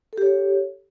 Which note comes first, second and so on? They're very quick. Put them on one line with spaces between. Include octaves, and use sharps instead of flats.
A4 G4 C#5